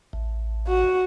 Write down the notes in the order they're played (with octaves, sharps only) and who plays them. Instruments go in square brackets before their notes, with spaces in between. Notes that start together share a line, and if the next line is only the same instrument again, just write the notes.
[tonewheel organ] A1
[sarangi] F#4